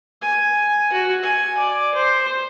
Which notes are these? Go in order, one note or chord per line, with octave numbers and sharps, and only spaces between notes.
G#5
F#4
G#5
D5
C5